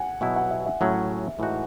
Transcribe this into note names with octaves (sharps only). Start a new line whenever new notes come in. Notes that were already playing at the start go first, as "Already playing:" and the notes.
Already playing: F#5 G#5
B2 F#3 B3 E4 F#5
F#5
E5
E5
A2 F#3 C#4
A2 E3 G#3 D#4 F#4